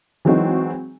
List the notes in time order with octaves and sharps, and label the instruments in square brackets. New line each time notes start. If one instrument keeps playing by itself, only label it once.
[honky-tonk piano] E3 F#3 G#3 C4 D#4 F#4